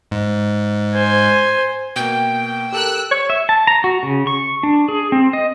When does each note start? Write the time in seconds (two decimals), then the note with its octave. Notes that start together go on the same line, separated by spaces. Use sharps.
0.11 G#2
0.95 C5 G#5
1.96 B2 A#3 G5
2.72 G4 A4 A#4 E6 F#6
3.11 C#5
3.30 E5
3.49 A5
3.67 A#5
3.84 F#4
4.03 C#3
4.27 C#6
4.63 D4
4.89 G#4
5.12 C4
5.33 D#5